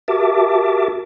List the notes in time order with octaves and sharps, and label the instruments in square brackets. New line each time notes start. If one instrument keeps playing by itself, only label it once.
[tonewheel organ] F#4 G4 A#4 E5 A5 D6